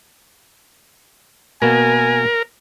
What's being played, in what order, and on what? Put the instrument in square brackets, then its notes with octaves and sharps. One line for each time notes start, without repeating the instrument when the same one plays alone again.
[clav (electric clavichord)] B2 A#3 B3 [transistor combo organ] A#4 [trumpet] G#5